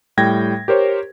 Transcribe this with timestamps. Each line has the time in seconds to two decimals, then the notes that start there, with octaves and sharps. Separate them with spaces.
0.18 A2 G3 G5 G#6 A#6
0.68 G4 A#4 C5 C#5